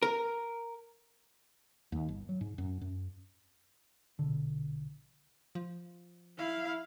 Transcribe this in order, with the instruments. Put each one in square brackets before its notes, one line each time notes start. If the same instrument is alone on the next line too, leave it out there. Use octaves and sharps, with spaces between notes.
[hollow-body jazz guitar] A#4
[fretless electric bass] D#2
G1
F#3
G#2
F#2
F#2
[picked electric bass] A#1 B2 D3
[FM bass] F3
[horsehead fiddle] E4 F5